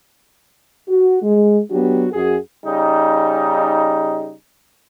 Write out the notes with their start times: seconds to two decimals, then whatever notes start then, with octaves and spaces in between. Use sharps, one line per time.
0.88 F#4
1.22 G#3
1.71 F#3 B3 D4 F#4 G4
2.12 F#2 F#4 G#4
2.66 C#3 G3 D#4